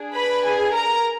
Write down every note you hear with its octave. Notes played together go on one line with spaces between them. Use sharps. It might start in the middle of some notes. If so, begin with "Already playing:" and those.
Already playing: D4 G#4
B4 B5
G#4 G#5
A#4 A#5